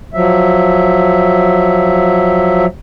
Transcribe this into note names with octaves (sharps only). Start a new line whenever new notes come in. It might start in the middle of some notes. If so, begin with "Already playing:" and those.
F3 F#3 E5